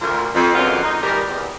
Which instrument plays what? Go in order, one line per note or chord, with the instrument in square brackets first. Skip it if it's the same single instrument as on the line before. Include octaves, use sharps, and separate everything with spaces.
[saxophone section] D2 F4 A#4
F2
F#2 D3 F#3 G#3 B3 F4
D#4
D#3 E3 G3 D#4 A#4
E2